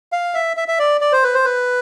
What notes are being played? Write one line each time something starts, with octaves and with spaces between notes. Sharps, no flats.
F5
E5
E5
E5
D5
D5
C5
B4
C5
B4